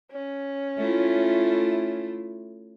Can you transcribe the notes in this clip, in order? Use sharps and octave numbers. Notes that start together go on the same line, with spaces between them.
C#4
A3 E4 F4